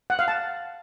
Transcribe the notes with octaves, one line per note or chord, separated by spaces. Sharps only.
F#5
F5
A5